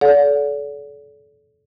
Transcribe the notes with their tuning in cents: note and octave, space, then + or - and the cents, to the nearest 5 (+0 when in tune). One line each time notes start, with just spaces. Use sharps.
A4 -30 D5 -40 F#5 -35